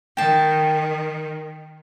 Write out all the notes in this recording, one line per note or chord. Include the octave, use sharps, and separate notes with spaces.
D#3 G5 A5